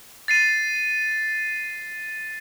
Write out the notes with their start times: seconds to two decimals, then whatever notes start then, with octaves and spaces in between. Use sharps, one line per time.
0.28 A6 C7 D#7